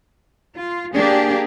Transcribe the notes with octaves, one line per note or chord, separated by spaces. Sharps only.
F4
A#3 D4 G4 G#4